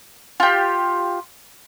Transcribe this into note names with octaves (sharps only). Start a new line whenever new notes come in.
F4 G4